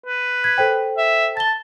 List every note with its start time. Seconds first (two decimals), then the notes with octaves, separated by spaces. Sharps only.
0.06 B4
0.44 G#6 B6
0.58 A4 C5 G5
0.98 E5
1.37 A5 A6 G7